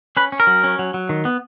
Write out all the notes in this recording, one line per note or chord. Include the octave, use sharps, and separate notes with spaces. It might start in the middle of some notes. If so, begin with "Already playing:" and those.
C#4 B4
C#4
A#4
F#3
C#4
F#3
F#3
D#3
B3